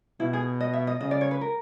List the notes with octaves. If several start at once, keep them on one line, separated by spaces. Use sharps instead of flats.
B2 E4
G#4
D#5
E5
D#5
C#3 D#5
D5
C#5
B4
A#4